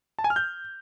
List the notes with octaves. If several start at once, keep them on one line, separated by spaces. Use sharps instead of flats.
A5
G#5
F6
G6